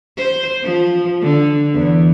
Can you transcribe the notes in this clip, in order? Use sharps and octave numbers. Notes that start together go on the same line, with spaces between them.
C5
F3
D3
E2